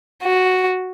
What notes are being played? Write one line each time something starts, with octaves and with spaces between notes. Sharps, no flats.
F#4